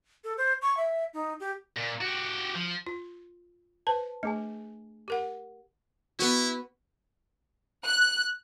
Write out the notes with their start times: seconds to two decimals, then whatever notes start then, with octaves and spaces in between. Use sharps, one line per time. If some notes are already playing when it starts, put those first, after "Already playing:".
0.24 A4
0.38 C5
0.62 C#6
0.77 E5
1.14 D#4
1.40 G4
1.77 A#2
2.01 F#4 G4
2.56 F3
2.86 F4
3.87 B4 C5 A5
4.23 A3 D4 G#4 G#5
5.08 G4 A#4 F#5
6.19 B3 E4 F#4
7.85 F#6